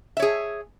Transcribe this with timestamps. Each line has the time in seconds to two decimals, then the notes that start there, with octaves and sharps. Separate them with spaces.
0.17 E5
0.20 C#5
0.22 G#4